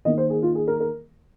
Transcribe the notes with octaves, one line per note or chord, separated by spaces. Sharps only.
D#3 A#3 D#5
C5
G#4
F4
G#4
A#4
A#4